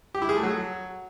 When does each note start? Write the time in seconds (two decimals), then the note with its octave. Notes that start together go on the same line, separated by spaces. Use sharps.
0.15 G4
0.22 E4
0.29 G#4
0.36 A3
0.43 F#3